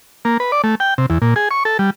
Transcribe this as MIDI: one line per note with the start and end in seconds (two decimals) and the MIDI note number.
0.25 0.37 58
0.40 0.51 71
0.52 0.62 74
0.64 0.75 57
0.80 0.94 79
0.98 1.06 48
1.10 1.18 40
1.22 1.34 46
1.36 1.49 68
1.51 1.63 85
1.65 1.78 69
1.79 1.90 55